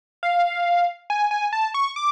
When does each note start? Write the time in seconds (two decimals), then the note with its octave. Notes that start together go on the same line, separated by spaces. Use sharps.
0.23 F5
1.10 G#5
1.31 G#5
1.53 A5
1.74 C#6
1.96 D6